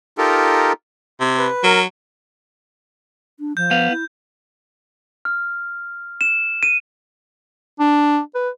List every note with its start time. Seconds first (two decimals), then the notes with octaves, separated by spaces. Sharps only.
0.18 D#4 F4 G4 A4 A#4
1.21 C3
1.38 B4
1.64 F#3 A#4
3.39 D4
3.57 F3 G6
3.71 B3 F5
3.91 E4
5.25 F6
6.21 E7
6.63 D#7
7.79 D4
8.35 B4